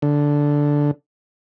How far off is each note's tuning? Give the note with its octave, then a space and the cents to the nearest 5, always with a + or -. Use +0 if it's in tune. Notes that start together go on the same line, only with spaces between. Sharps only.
D3 -5